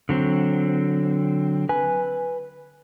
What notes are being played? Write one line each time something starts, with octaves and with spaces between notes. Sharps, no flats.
D3 F#3 C4
B4 G#5